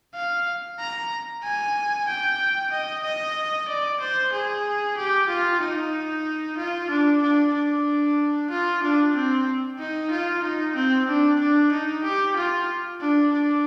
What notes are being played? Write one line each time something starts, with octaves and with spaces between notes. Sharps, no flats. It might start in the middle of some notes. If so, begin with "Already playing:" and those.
F5
A#5
G#5
G5
D#5
D#5
D5
C5
G#4
G4
F4
D#4
F4
D4
D4
D4
F4
D4
C4
D#4
F4
D#4
C4
D4
D4
D#4
G4
F4
D4
D4